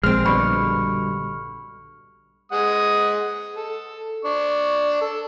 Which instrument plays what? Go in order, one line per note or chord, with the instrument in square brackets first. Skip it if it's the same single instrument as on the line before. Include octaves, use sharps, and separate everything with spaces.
[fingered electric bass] A#1 [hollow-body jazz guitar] G#3 C4 [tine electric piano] F6
[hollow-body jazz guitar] G2 B2 D3 [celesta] B5 C#6 C#7
[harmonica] G#3 F#5 D#6
A4
D4 C#6
A4